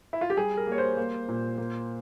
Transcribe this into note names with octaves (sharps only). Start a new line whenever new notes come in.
E4
F4
G4
G3 G#4
A#4
A#3 C#5
C5
A#3
A#2
A#3